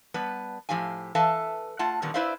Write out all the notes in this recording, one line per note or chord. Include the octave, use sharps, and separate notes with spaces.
G3 B3 B4 A5
A2 F3 G4 F5 G#5
E3 A4 B4 E5 F5 A5
A3 F4 F#5 A5
A#2 D3 D#3 G3 B3
E4 B4 C5 D5 E5 F5